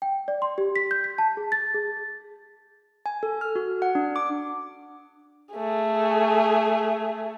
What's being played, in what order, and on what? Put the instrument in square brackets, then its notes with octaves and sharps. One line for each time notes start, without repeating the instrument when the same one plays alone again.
[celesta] G5
D5
C6
G4
B6
G6
B6
A5
G#4
A6
G#4
[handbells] G#5
A4
F6
F#4
F#5
D4
D6
[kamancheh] A3 G#4